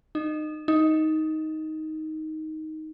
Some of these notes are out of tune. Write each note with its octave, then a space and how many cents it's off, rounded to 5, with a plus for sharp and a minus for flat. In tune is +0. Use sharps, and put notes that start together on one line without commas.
D#4 -25
D#4 +10